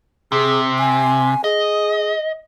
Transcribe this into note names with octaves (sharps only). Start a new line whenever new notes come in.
C3 G#4
G#5
G#4 D#5